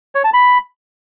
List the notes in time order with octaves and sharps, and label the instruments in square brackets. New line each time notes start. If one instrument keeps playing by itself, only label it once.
[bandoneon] C#5
A5
B5